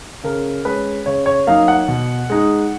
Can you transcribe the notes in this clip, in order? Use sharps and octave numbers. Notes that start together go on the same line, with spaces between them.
C#3 A#4
G#3 C#4 B4
C#3 C#5
C#5
F#3 A#3 D#4 F5
F#5
B2
G#3 D#4